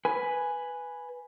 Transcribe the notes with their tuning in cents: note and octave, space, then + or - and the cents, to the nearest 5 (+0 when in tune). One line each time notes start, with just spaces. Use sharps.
B4 +0 G#5 +0